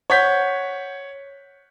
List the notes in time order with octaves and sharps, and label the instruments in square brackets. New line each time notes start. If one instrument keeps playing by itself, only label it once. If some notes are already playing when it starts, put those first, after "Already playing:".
[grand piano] C#5 F#5 G6 B6